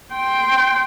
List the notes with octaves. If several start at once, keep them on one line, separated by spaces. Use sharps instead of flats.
G5 C6